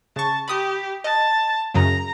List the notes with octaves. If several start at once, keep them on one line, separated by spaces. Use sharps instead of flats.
C#3 A5 C#6
G4 B5 D#6
D#5 A5
F#2 C#3 F#3 A#5